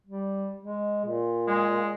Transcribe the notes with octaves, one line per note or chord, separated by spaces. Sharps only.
G3
G#3
A#2
G#3